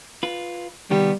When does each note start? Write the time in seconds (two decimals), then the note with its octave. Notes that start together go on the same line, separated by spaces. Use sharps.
0.23 F4 B4
0.91 C2 D#3 G3 B3